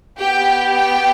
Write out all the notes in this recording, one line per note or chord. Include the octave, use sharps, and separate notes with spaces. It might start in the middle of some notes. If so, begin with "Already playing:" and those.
B3 G4 G5
G5